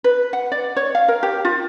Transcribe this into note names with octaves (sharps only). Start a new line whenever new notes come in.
B4
F#5
D5
C#5
F5
A#4
G4
F4